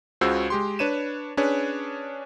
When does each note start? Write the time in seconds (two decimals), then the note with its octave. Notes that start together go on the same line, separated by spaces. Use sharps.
0.21 C#2 C#3 F4 F#4 C5 E6
0.50 G#3 G4 C6
0.79 D4 B4 C#5 D#7 E7
1.37 C#4 D4 G#4 B4 C#5